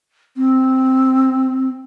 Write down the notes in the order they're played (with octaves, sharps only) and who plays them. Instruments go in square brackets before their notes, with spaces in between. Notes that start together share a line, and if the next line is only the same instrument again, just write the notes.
[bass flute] C4